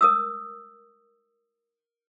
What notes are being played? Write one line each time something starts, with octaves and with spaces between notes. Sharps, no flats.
A#4 D#6 E6